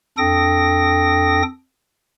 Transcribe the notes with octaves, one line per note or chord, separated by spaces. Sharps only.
F2 D4 A4 G5 D#6 A#6